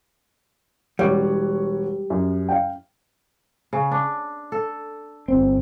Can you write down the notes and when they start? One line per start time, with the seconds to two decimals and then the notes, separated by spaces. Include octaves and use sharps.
0.99 E1 G3 C#5 F#5
2.10 F#2
2.49 F5 G5
3.73 C#3
3.91 D4
4.52 A4
5.28 G1 C4